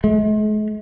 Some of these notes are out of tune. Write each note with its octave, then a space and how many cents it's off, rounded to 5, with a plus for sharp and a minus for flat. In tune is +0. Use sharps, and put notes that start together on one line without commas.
G#3 +45